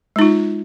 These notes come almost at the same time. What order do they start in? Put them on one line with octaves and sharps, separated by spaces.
G#3 D#4 F4